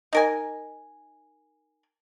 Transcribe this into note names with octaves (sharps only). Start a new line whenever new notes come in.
D#4 A#4 G#5